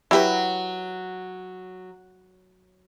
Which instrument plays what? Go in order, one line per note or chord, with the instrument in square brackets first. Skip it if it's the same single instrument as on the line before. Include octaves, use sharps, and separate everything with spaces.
[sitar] F#3 [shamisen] E4 G4 B4